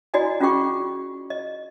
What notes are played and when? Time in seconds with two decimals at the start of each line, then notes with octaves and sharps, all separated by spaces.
0.14 E4 F#4 D5 D#5 G#5
0.40 C#4 F4 F#4 G#4 G5 C#6
1.30 D#5